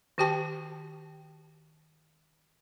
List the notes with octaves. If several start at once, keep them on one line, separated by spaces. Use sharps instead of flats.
D#3 F#4 G4 G5 A5